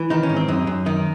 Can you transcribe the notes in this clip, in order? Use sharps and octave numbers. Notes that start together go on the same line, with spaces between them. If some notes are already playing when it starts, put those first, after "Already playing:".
Already playing: E3
D#3 D#4
C#4
G#2
C4
F#2 D#4
F#2
D#3 D#4